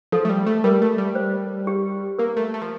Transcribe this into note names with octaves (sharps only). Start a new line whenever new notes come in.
F3 A4
A3
G3
A3
G3 A#4
A3
G3
C5
G4
A#3 A#4
A3
A3
F3